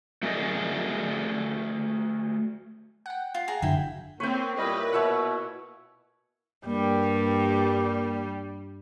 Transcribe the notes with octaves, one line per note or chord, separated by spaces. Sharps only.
A3 F#4 G#4 A#4 D5 D#5
F#5 G5
F4
G#4 A#5
F#1 D3 F#3 E4 G5
A#3 C4 B4 C#5 G5
A#2 G3 E4 B4 D#5
B2 C#5 E5 F#5
G2 G3 A#3